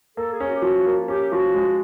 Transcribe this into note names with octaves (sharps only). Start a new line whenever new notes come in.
A#3 A4
G#4
C#4
F#4
G4
F3 F#4
A#3
C#4 G4
F3 F#4
G#3